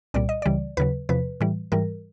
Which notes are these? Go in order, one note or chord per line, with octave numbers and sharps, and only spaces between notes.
C2 A#2 G3 D5
D#5
C#2 C#3 E3 G3 D5
D#2 C#3 F#3 B4
E2 C3 F3 B4
A2 E3 G3
G#2 E3 G3 A#4